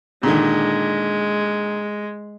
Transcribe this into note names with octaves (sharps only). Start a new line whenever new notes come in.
A#2 D3 D#3 G#3